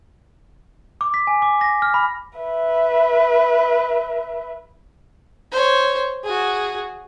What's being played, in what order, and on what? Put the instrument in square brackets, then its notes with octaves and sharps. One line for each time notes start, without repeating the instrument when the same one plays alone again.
[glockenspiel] D6
B6
G#5
D6
A#6
F6
B5
[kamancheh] B4 E5
[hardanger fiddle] C5 C#5
F#4 G#4